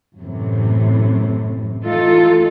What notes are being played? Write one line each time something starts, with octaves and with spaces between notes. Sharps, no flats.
F#2 A2 C3 E3
E3 A3 D#4 F4 A4